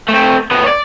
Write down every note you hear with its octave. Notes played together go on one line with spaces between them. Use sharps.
A3 C4
A2 B3
C#5 D5